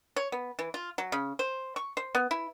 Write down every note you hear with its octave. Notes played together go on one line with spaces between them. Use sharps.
C#5
B3
E3
F4
F#3
C#3
C5
C#6
C5
B3
E4